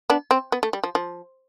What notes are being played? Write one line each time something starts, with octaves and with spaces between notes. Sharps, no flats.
B3 D4
C4
B3
A3
G3
F3
F3